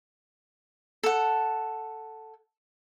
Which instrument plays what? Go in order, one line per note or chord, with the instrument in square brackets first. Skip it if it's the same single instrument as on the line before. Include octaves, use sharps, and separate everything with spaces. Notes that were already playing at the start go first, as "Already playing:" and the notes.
[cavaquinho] A4 F#5